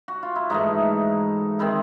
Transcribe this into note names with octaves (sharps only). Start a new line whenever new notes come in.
F#4
F4
E4
G#2 E3 A3 D#4
D#3 G#3 C4 E4